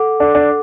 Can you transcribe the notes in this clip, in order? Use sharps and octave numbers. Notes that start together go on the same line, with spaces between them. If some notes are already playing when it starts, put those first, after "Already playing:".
Already playing: A4 F#5 D6
D4 A4 F#5 D6
D4